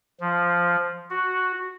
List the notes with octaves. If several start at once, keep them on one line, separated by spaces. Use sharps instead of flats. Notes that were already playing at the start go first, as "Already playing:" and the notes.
F3
F#4